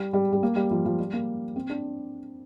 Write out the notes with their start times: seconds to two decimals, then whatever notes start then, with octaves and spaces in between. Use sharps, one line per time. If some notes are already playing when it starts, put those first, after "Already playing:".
Already playing: G3
0.13 G3
0.33 G3
0.43 A#3
0.56 G3
0.71 F3
0.85 F3
0.99 G3
1.13 A#3
1.56 C4
1.69 D4